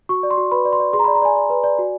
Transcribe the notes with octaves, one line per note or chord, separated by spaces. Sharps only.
F#4 C#6
D5
C6
F#4
B4 B5
D5
C6
D5
G#4 C6
A#5
D5 B5
A#5
D5 G#5
D5
B4
D5
F#4